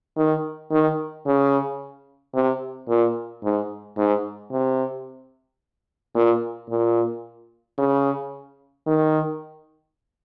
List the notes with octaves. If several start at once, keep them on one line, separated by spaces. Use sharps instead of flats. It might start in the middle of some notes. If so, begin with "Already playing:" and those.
D#3
D#3
C#3
C3
A#2
G#2
G#2
C3
A#2
A#2
C#3
D#3